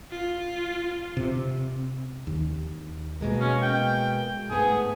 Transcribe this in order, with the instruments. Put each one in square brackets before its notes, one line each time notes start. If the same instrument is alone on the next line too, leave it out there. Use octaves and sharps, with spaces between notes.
[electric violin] F4
[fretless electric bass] C3
D#2
[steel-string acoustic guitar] B2 G#3 A#3
[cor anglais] C#4
G5
[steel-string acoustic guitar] G#2 A3 B3 [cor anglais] G#4